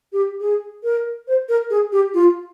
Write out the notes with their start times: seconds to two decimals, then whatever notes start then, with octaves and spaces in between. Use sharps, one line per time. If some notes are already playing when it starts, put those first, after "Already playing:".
0.13 G4
0.40 G#4
0.83 A#4
1.28 C5
1.49 A#4
1.70 G#4
1.92 G4
2.14 F4